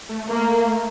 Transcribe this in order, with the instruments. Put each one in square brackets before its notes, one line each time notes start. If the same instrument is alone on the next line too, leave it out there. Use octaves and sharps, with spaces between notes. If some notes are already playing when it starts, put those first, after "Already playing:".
[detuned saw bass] A3
[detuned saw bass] A3 [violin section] A#3